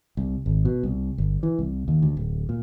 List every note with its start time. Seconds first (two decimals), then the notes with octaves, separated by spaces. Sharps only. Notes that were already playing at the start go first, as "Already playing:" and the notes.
0.17 C2
0.46 G#1
0.65 B2
0.83 C2
1.18 G1
1.43 E3
1.59 C2
1.88 D#2
2.02 D2
2.17 D1
2.49 A#2